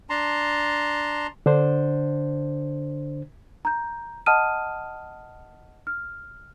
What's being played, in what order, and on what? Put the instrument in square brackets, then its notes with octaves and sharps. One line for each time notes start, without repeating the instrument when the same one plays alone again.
[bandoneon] D4 A5 A#5 C6
[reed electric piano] D3 D4 C5
[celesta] A#5 G6
D#5 F#5 A5 D#6 F6 D#7
F6